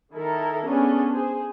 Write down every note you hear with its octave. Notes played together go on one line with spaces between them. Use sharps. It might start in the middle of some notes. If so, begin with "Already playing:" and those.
D#3 E4 A4 A#4
B3 C#4 D4 G#4 A4
G#4 C5